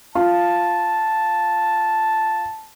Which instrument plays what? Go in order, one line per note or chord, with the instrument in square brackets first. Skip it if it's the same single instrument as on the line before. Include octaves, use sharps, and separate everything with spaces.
[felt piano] F4 [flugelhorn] A5